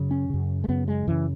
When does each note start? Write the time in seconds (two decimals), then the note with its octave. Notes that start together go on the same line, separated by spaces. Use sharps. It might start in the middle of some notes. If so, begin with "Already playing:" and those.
Already playing: F#2 C#3
0.11 C#4
0.30 F#2 C#3
0.64 G#3
0.68 F#2 C#3 B3
0.88 G#3
1.07 F#2 C#3 E3